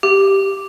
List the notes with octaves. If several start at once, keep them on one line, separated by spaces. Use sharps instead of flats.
G4